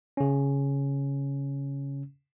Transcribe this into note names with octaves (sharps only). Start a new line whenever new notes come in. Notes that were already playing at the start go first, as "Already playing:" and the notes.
C#3 C#4